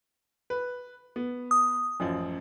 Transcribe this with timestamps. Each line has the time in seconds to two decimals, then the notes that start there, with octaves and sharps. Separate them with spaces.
0.50 B4
1.16 B3
1.51 D#6
2.00 A1 F#2 F3